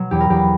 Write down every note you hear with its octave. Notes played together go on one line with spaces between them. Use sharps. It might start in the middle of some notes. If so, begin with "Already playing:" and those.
Already playing: B2 F#3
E2 G4
A#4
E2 G4